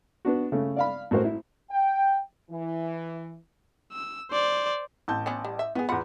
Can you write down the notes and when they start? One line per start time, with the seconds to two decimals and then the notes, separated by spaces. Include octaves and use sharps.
0.25 B3 D4 F#4
0.52 C#3 A3
0.76 D5 F5 B5
1.11 A1 F#4 A#4 C5
1.24 E4
1.70 G5
2.50 E3
3.93 E6
4.31 C5 D5
5.08 A1 A5 G6
5.26 B3 C#4 D4
5.45 G3
5.59 E5
5.75 D#3 B3 G#4
5.89 E2 F4 F#5 B5